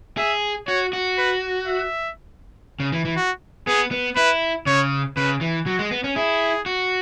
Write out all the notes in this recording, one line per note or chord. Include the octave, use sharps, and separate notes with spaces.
G#4 E5
F#4 C#5
F#4
B4
E5
C#3
E3
E3
F#4
B3 G#4
B3
E4 B4
C#3 C#5
C#3 B4
E3
F#3 F#4
G#3
B3
C#4
E4 G#4
F#4